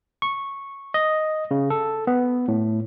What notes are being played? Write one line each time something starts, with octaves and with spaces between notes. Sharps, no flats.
C#6
D#5
C#3
A4
B3
A2